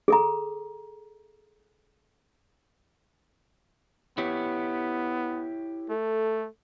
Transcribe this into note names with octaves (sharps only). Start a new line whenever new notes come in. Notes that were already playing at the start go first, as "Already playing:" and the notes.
G#4 A4 A#5
B3 E4 G4 C#5
A3 A4